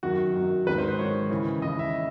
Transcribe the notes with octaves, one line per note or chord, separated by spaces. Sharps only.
F#2 D#3 F#4
F#2 D#3
G#2 D#3 B4
C5
C5
G#2 D#3 C#5
D#2 C#3 E3
D#2 C#3 E3 D#5
E5